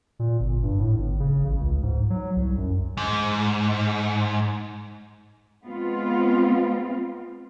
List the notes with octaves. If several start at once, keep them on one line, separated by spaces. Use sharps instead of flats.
A#2
G1
G2
A2
G1
C#3
A1
C#2
G#2
F#3
C2
F#2
G#2
G#3 B3 C4 F4